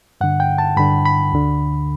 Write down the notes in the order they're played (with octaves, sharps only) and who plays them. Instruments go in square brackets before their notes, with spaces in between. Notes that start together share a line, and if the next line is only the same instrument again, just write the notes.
[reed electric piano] G2 D3 F#5
G5
A5
G2 D3 B5
B5
D2 D3